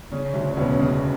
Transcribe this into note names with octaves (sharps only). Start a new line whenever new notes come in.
C#3 C#4
D2
C#4
E1 B3
C#3